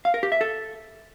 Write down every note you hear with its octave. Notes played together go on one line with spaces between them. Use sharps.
F5
A#4
G4
E5
A4